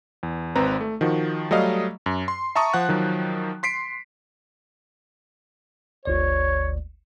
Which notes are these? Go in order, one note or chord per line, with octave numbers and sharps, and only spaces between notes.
E2
G#1 C4 B4 A#5
A3
D#3 F3 F#4
F#3 G3 A3 D#5 F5
F#2
C6
E5 A5 A#5 C#6 D#6
F3 F#5 F#6
D#3 F3 F#3
C6 B6 C7 D7
G1 D2 C#5 D5